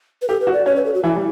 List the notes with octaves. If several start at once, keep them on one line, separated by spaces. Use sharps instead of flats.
B4
G4 A4
B4
F#4
D5
C#4 C#5
B4
A4
F#4
E3 E4
G3